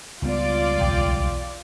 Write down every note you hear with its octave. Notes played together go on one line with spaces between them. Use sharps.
C#2 G3 B3 F4 D5
B1 E2 G5